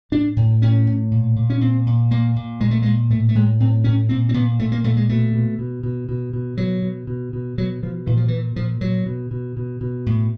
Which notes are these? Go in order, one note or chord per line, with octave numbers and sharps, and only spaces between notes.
A2 D4
A2
A2 C#4
A2
A#2
A#2
C#4
A#2 C4
A#2
A#2 A#3
A#2
A#2 G#3
A3
A#2 G#3
A2 A3
A3
A2 G#3
A2 C4
A2 C#4
A#2 C4
C4
A#2 B3
A#2 A3
A#3
A#2 A3
G#3
B2 A3
B2
B2
B2
B2
B2
B2 F#3
B2
B2
B2
B2 F#3
B2 F3
A#2 E3
F3
A#2 E3
A#2 F3
A#2 F#3
B2
B2
B2
B2
A2